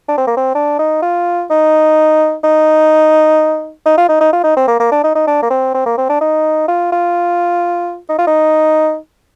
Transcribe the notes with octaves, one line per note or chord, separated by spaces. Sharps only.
D4
C4
A#3
C4
D4
D#4
F4
D#4
D#4
D#4
F4
D#4
D#4
F4
D#4
C4
A#3
A#3
D4
D#4
D#4
D4
A#3
C4
C4
A#3
C4
D4
D#4
F4
F4
D#4
F4
D#4